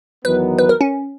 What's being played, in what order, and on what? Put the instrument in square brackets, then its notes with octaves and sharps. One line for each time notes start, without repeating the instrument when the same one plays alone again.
[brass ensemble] E2 D#3 F#3 B3 [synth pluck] B4
[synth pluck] B4
A#4
C#4